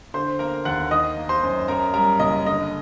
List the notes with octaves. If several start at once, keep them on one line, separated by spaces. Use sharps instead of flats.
D3 C5 C6
A#3 A#4 A#5
D#2 F#5 F#6
D#3 D#5 D#6
A#3
C5 C6
F#2
F#2 A#4 A#5
G3 A#4 A#5
F#1 D#5
D3 D#5